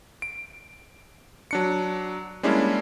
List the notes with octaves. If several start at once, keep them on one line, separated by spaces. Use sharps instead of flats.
D7
F#3 D4 C#7
G3 G#3 A#3 C#4 D4 E4